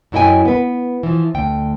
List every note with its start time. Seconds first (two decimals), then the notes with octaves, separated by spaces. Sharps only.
0.12 F#2 F#3 E4 D#5 G5 G#5
0.45 B3 B4
1.03 E3 F3
1.35 D2 G5